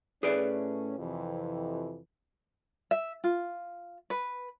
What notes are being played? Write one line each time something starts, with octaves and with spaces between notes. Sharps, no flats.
A2 A3 C#4 G#4 B4 D5
F2 C3 E3
E5
F4
B4